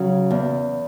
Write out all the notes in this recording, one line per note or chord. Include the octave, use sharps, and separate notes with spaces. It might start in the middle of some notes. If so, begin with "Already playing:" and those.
Already playing: C#3 F#3
E2